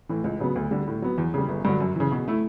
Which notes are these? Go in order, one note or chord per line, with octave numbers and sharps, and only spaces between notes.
A2 E3
C#2
C#3 F#3 B3
D2
D3 G3
A2
F#3 B3
E2
C#3 G3
G1
G2 D3 F#3
F#2
C#3 E3
B2
A3 E4